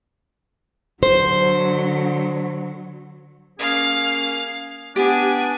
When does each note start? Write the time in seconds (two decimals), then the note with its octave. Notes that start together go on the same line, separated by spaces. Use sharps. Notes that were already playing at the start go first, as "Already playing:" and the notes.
1.03 D3 F#3 C5
3.59 A#3 C#4 G#4 F5
4.96 B3 D4 G4 G#5